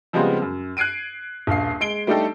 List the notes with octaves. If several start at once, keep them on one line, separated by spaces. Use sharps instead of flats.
C#3 F3 G3 G#3 B3 C4
F#2
F#6 G#6 C7 D7 D#7
D#1 A#1 F5 C7
G#3 C7 D7 G7
G3 A3 D4 D#4 G4 A4